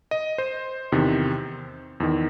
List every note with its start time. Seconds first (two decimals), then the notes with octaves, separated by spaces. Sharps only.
0.11 D#5
0.38 C5
0.92 E2 C3 D#3
2.00 E2 D#3